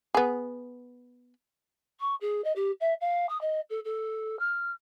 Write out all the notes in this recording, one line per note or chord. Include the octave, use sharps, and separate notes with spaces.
B3 G#4
C#6
G#4
D#5
G4
E5
F5
D#6
D#5
A4
A4
F6